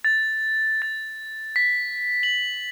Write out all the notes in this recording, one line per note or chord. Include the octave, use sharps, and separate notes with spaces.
A6
A6
B6
F#7